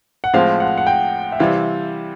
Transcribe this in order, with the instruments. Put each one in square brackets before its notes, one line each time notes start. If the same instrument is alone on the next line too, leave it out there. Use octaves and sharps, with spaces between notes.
[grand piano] F#5
[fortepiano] A2 F3 G#3 C4 [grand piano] F5
[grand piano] F#5
F#5
G5
E5
[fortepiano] C3 E3 G3 [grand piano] F5